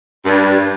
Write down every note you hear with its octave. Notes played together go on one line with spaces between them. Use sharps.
G2